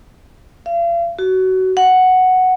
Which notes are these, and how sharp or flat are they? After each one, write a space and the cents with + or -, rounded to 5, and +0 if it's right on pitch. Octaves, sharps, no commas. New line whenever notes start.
F5 -40
F#4 +20
F#5 +0